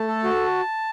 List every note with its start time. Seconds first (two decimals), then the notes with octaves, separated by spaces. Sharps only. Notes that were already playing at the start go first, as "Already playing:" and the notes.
Already playing: A3 A5
0.08 A4
0.24 F#4